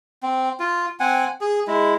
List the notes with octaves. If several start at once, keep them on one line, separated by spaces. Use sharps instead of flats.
C4
F4
C4 F#5 G#5
G#4
G#3 E4